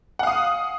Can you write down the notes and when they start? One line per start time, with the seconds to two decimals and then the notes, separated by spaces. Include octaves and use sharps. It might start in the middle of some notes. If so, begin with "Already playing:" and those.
0.19 F#5
0.23 F5
0.27 D#6